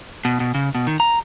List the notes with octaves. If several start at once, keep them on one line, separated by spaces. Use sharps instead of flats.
B2
B2
C#3
B2
D#3
A#5